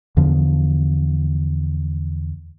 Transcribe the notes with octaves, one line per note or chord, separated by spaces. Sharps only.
E2 D3 F3